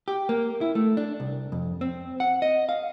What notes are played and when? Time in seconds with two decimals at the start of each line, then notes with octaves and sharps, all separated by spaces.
0.08 G4
0.29 A#3
0.61 E4
0.75 A3
0.97 D4
1.20 C2
1.52 F2
1.81 C4
2.20 F#5
2.42 D#5
2.69 F5